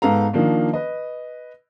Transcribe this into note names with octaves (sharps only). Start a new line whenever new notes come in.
G#2 B3 A4 F5 A#5
D#3 F3 A#3 D4
B4 D#5